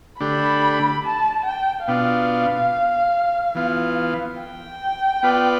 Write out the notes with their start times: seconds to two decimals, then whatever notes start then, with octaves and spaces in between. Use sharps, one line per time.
0.20 D3 A3 D4 G4 B5
1.04 A5
1.45 G5
1.88 B2 B3 D4 F4 F5
3.55 E3 B3 F4
4.39 G5
5.23 B3 F4 B4 D5